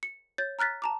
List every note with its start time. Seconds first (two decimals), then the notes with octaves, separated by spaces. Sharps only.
0.03 C#7
0.38 C#5 G6 A6
0.59 A#5 F6 F#6 A6 B6
0.82 A5 A#5 D6